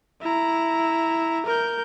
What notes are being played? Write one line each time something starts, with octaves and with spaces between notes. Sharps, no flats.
E4 A#5
A#4 G6